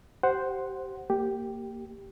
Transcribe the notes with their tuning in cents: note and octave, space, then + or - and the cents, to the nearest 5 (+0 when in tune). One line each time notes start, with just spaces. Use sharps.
G4 -20 C5 +0 F#5 +0
A#3 -20 G4 +0